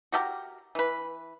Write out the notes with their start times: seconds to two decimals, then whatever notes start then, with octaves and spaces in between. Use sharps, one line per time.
0.12 F#4 G4 A4 A#4
0.75 E3 B4